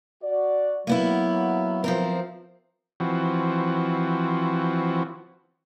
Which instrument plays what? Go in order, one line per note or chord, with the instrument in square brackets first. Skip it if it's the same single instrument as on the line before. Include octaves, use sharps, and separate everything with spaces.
[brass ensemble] F#4 D5
[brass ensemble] F#3 [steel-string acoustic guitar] A#3 B3 E4
[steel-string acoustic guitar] F3 C4 A#4
[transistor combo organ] E3 F3 C4 F#4